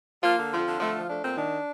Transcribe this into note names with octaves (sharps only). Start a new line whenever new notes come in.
F3 A#3 F4
D3
F2 F3 F4
D3
F3 A3 F4
F3
A3 D4
A#2 C4
D#3 D4